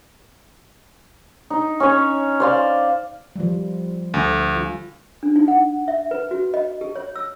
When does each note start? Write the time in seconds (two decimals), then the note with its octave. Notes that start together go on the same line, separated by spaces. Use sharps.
1.50 D#4
1.80 C#4 C#5
2.40 C5 D5 F5
3.36 F3 G3
4.14 D2
4.56 F4
5.23 D4
5.36 D#4
5.48 F#5
5.88 E5
6.11 B4
6.31 F#4
6.54 D#5
6.81 G4
6.95 C#5
7.16 E6